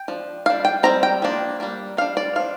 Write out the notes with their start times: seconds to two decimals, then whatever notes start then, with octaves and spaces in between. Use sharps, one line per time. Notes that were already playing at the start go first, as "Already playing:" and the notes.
Already playing: G5
0.08 F3 D4
0.46 G3 D4 F5
0.65 G5
0.83 G3 C4 A#5
1.03 G5
1.22 F3 A#3 D4
1.60 G3 A#3 D4
1.97 G3 D4 F5
2.17 D5
2.36 F3 D4 F5